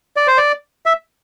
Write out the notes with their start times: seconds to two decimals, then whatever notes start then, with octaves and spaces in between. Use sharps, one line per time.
0.17 D5
0.27 C5
0.38 D5
0.86 E5